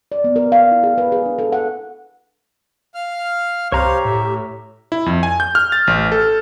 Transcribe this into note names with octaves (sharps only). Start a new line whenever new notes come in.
D5
B3
A#4
F5
E4
G#4
B4
G#4
D4
A4
F#5
F5 F6
C2 G4 C5 C#5 F5 A#5 F6
A2 E5
E4
F2
G#5
G6
F6
A6
A1
A4